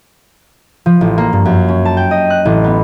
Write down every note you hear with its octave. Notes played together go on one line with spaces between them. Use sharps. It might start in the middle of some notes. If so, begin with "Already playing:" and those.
F3
A1
A#3
G2
F#2
C#4
A5
G5
D#5
F#6
A1
B3